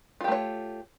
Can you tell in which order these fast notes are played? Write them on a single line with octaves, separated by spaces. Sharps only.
F4 G4 A3 C#5